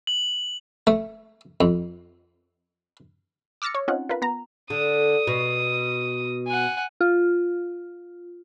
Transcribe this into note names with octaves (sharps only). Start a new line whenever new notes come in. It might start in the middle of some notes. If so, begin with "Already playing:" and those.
F#7
A3
F2
D6 E6 F6 A6 A#6 C#7
C#5
C4 C#4 D#4 F4 F#5
F4 A#4 B4
B3 A#5
D3 D#6
B2
F#5 G#5
F4